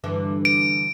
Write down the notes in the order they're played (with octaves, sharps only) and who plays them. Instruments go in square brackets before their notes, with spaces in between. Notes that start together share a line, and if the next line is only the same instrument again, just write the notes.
[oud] G2 D3 E3
[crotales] D7